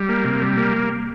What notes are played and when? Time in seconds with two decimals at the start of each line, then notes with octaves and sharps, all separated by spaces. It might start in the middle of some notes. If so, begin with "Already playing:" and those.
Already playing: G3
0.09 A#3
0.24 C3
0.41 G3
0.57 A#3